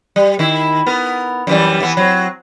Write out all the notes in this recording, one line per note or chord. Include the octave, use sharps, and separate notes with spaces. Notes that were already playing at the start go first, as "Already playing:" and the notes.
G3
D#3 E4
B3 A#4
F#2 E3 G3
E3 B3
F#3 C4